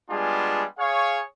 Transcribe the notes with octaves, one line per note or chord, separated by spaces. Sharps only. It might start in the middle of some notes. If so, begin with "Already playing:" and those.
G3 G#3 B3 D4 F4 G#4
G#4 C#5 F5